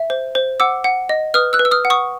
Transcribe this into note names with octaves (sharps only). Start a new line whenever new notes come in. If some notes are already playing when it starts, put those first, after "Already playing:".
Already playing: E5
C5
C5
F#5 D6 E6
F#5
D#5
B4 D#6 F6
E6 F#6
B4
E6
D#6 F6
F#5
C#6 D#6